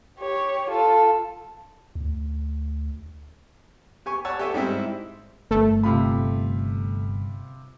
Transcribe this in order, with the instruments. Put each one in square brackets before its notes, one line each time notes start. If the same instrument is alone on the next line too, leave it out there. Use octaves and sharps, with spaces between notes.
[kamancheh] G4 C#5
F4 A4
[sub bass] D2
[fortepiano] G4 G#5 C#6
C#5 D5 F#5 A5 C#6 E6
G4 A4 C#5 E5 G#5
G#2 G3 C4 E4 E5 E6
[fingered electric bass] G1 [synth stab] A3
[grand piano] C3 F4 B5